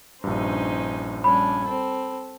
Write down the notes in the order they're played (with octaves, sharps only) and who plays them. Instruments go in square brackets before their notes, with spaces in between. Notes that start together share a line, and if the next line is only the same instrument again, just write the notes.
[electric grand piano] A#1 G2 [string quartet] C#4 D#4 C5
[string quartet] G3 C#4 D4 [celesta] B5
[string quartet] C4 A4